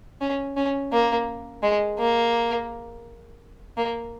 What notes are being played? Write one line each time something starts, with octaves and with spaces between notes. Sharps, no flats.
C#4
C#4
A#3
G#3
A#3
A#3